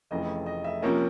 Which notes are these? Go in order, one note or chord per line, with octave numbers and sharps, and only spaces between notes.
F1 F2 C#3 E3 A3 D#5
D#5
E5
C3 F3 A#3 C#4 A#5